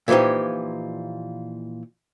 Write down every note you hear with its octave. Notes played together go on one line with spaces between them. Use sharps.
A#2 E3 F3 D#4 G4